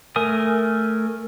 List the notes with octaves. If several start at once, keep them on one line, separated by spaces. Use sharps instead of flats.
A3 A#4 G#5 D#6